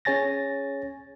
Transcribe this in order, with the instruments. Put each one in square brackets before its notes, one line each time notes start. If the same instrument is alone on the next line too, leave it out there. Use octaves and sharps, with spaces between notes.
[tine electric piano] C#4 G#4 C#5 G#5 A6 A#6